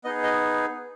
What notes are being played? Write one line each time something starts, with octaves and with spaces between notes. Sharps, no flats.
B3 D#4 G#4 D#5
D#5